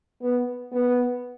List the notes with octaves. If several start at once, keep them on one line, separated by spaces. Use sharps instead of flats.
B3
B3